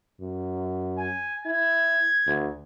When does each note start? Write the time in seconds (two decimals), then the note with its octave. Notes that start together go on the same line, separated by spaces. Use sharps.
0.20 F#2
0.98 G#5
1.46 E4 G#6
2.26 D2